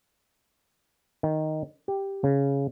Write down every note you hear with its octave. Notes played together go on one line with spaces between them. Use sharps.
D#3
G4
C#3